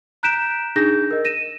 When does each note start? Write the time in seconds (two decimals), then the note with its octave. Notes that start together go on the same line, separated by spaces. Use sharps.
0.23 A#5 F#6 G6 B6 D7 E7
0.76 D4 D#4 G#4 G6 A#6
1.11 A#4 D#5
1.25 A#6 D#7 E7